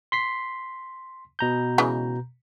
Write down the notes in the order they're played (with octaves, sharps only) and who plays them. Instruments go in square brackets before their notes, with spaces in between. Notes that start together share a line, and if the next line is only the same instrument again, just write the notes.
[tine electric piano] C6 B6 C7
B2 A#5 G6
[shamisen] C#3 E3 G#3